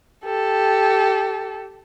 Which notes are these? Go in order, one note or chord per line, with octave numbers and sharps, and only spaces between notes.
G4 A4